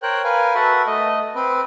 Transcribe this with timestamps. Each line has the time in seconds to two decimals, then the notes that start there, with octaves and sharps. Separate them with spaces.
0.03 A#4 C5 C#5 G5 F#6
0.24 A#4 B4 F5 G#5
0.55 F#4 A4 B4 E5 F#5
0.87 A3 D#5
1.35 C4 B4